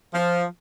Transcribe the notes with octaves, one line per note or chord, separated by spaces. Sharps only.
F3